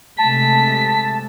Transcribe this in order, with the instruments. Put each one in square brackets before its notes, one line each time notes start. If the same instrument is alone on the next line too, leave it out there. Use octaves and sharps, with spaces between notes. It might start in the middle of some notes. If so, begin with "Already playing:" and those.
[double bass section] C3 G#3 A3 [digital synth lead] A5 [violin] B6